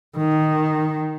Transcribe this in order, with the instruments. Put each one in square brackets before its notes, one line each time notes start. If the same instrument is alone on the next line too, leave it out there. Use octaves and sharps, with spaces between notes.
[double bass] D#3